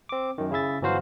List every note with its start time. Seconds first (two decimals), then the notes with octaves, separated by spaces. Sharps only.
0.09 C4 D6
0.38 F#2 D#3
0.51 C#3 E4 G#4 E5 A6
0.81 G1 E3 F#3 F#4 C5 F5